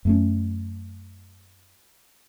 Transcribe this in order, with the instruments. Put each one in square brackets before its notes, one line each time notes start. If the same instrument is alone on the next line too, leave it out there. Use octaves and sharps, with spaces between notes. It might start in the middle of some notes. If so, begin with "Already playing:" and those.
[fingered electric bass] F#2 A3 C#4